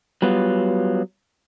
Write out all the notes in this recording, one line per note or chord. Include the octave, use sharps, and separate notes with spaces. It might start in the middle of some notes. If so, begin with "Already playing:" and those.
F#3 G3 B3 F4